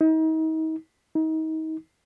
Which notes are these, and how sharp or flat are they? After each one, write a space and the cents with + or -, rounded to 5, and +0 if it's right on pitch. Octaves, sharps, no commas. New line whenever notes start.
D#4 +35
D#4 +30